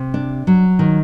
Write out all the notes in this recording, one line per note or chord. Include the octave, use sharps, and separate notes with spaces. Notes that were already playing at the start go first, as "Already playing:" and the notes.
Already playing: C3
D4
F#3
D#3